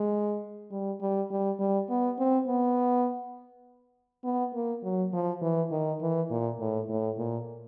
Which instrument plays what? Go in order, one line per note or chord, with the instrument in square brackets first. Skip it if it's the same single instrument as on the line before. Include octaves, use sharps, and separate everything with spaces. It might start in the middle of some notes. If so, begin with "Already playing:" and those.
Already playing: [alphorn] G#3
G3
G3
G3
G3
B3
C4
B3
B3
A#3
F#3
F3
E3
D#3
E3
A#2
A2
A2
A#2